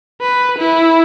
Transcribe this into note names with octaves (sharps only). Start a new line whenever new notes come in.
B4
E4